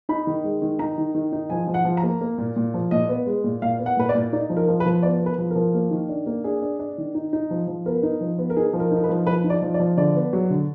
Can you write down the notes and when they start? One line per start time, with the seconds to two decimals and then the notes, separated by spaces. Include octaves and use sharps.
0.09 D#4 B5
0.27 D#3
0.44 G#3
0.62 D#3
0.79 D#4 A#5
0.98 D#3
1.15 D#3
1.32 D#4
1.50 F3 G#5
1.67 F3
1.74 F#5
1.85 F3
1.97 A#5
2.03 A#3
2.21 A#3
2.38 A#2
2.56 A#2
2.74 F3
2.91 A#2 D#5
3.09 B3
3.26 G#3
3.44 A#2
3.62 A#2 F5
3.79 B3
3.86 F#5
3.97 A#2 B4
4.09 D5
4.15 A#2
4.33 D#4 D5
4.50 F3
4.57 A#4
4.68 F3
4.80 B4
4.86 F3
5.03 B3 D5
5.21 B3
5.26 B4
5.38 F3
5.51 F3 A#4
5.74 A#3
5.91 D#3
6.09 D4
6.26 A#3
6.44 D4 G#4
6.62 D4
6.79 D4
6.98 D#3
7.15 D#4
7.33 D#4
7.50 F3
7.67 F3
7.86 B3 A#4
8.03 D#4
8.21 F3
8.39 B3
8.50 A#4
8.57 D#4 G#4
8.73 F3
8.80 A#4
8.91 D#4
8.97 A#4
9.04 B4
9.09 F3
9.27 F3 B4
9.44 D#4
9.50 D5
9.62 F3
9.74 D5
9.80 F3
9.97 D3 D5
10.16 B3
10.33 F#3
10.50 D3